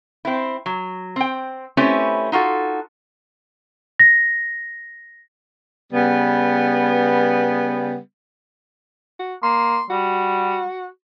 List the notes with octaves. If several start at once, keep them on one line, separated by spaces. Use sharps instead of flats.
C4 E4
F#3
C4 G5
A3 C4 C#4 E4 G4 B4
D#4 F4 F#4 A4
A#6
C#3 G3 B3
F#4
A#3 C6
G3 F#4